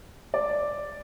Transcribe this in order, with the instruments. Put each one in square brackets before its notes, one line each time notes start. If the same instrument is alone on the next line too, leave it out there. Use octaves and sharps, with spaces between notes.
[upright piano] D5